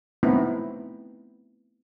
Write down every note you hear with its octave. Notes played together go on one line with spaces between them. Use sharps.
A3 B3 C4 D#4 E4